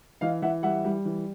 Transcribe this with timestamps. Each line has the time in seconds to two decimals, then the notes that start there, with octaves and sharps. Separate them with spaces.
0.21 E3 D#5 F5
0.42 E3 E5 F#5
0.63 G3 E5 F#5
0.85 G3
1.05 E3